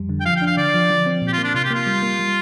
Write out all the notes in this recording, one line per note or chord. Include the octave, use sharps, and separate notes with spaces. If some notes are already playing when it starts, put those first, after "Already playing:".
Already playing: F2 G3
D3
G5
F3 F5
G5
D4 F5
D3 D5
F3
F3
C4
A#2
G4
F4
A#3
D4
C3 F4
G4
A#3 F4
G3
A#3
G3